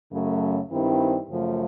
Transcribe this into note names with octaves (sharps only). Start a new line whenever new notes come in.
F#2 C#3 F#3 A3
G2 D#3 G3 C4 E4
F#2 C#3 F3 A3